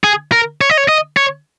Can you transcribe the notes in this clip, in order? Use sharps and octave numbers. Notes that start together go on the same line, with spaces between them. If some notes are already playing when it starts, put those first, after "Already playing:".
G#4
A#4
C#5
D#5
C#5
D#5
C#5